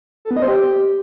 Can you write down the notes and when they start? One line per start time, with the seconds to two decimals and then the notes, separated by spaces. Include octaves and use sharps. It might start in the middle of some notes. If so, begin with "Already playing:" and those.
0.25 A4
0.31 B3
0.37 D#5
0.42 C5
0.48 G4